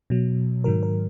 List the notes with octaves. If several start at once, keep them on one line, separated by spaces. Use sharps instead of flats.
B2 F#3
G#2 D#3 F#3 A#4
A#4